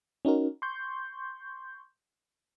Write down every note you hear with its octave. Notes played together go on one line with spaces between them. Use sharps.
C#4 D#4 F#4 A#4
C6 C#6 G6